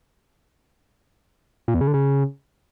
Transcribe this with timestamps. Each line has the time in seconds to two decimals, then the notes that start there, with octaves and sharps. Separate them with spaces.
1.68 A#2
1.74 E2
1.81 C#3
1.87 D3
1.94 C#3